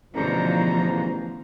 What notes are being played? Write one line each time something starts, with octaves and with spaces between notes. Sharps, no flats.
A1 E2 B2 D3 E3 F3 C5 A#5